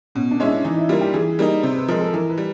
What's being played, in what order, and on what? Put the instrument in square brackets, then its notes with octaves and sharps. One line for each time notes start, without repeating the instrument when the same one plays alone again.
[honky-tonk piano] B2 [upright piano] C#4
[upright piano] D4
[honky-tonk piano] G#3 C#4 E4
[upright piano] D4
[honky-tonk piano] E3 [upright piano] D#4
[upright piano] E4
[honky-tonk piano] G3 A#3 [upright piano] F4
[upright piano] G4
[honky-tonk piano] E3 [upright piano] G#4
[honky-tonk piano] G3 A#3 D#4
[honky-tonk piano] C3 [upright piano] C5
[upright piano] B4
[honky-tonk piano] F3 G#3 [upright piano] A#4
[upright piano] A4
[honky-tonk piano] E3 [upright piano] A#4
[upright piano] B4
[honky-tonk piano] G3